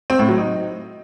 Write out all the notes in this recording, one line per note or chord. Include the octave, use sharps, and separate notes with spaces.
C4
A2
F#3
D#4